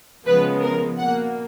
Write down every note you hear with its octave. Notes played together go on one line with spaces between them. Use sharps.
C#3 F3 G#3 B3 B4
A#4
B2 A#3 F#5